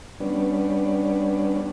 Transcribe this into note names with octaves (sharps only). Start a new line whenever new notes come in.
G3 B3 C#4 D4